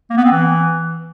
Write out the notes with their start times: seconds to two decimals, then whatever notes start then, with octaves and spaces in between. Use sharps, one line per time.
0.10 A#3
0.17 B3
0.24 C4
0.32 E3